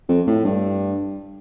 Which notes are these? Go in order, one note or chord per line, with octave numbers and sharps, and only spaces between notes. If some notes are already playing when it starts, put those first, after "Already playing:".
F2
A2
G2